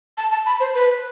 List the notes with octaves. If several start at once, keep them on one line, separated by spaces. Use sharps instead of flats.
A5
A5
B5
C5
B4